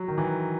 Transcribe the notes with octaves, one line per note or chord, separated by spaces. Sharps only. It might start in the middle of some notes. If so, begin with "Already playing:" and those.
Already playing: F#3
D#3
E3